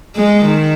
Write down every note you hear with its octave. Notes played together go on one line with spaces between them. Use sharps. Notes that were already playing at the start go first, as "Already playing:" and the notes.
G#3
D#3